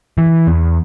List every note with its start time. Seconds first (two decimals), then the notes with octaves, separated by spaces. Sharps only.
0.18 E3
0.47 E2